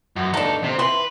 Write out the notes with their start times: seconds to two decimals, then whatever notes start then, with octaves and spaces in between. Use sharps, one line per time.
0.16 F#2
0.34 C#2 D4 D#4 A4
0.64 C3 C4
0.79 E3 B4 C6